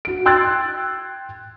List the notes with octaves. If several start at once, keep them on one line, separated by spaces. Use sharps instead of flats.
F#4 D7
G5 C6 E6 F#6 G#6 A6